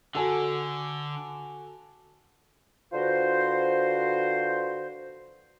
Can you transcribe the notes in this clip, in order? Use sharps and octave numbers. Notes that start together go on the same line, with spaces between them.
D3 F#4 A4 G#5
D3 F4 F#4 B4 C5